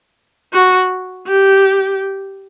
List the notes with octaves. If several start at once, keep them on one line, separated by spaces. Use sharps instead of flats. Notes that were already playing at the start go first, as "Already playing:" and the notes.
F#4
G4